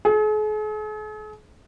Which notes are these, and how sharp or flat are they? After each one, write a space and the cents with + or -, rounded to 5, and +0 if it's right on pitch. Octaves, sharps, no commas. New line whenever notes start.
G#4 +45